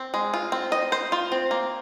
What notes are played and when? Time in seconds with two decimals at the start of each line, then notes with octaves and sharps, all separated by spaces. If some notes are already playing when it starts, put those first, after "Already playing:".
Already playing: C4
0.14 G#3
0.34 F4
0.52 C4
0.72 D#5
0.92 C5
1.12 F4
1.32 C4
1.51 A#3